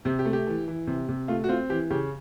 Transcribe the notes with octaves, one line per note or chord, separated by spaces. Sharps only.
C3 G4
G4
A3
G4
E3
E3
C3
C3
A3 F4
F#4
C4 F4
E3 G4
C#3 G4